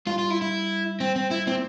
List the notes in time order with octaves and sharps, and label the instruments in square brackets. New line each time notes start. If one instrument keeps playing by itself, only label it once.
[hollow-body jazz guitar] G2 [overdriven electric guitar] F4
[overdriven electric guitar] F4
E4
E4
C4
C4
E4
[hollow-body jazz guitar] A#2 [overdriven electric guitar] C4